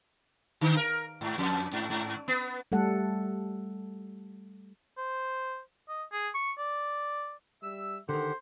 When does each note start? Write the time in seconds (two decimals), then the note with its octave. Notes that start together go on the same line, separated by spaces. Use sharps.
0.61 D3
0.77 A#4
1.21 G#2
1.38 F2
1.73 G#2
1.90 G#2
2.28 B3
2.72 G3 A3 A4 F#5
4.98 C5
5.89 D#5
6.12 G#4
6.34 C#6
6.58 D5
7.63 G3 E5 E6
8.09 D3 D#3 G4 A4 C5 F#5